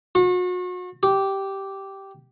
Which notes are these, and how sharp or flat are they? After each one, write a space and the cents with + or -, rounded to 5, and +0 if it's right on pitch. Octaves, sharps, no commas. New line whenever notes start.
F#4 -40
G4 -10